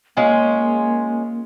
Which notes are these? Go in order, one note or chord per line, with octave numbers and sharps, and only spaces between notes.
G#3 A#3 C#4 F4